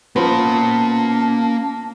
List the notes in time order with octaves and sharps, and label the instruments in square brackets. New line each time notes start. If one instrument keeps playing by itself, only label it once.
[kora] F3 B3 [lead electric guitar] A#3 C6 [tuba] C#4 [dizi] A5